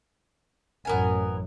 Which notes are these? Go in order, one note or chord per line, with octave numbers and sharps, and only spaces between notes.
A1 F#2 B3 A#4 G#5